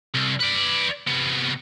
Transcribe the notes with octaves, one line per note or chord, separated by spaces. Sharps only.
C2
B4 D5
C3 B3